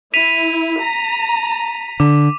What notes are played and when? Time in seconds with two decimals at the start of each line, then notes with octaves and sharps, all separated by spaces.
0.14 E4 B6 D#7 F7
0.80 A#5
2.00 D3 D6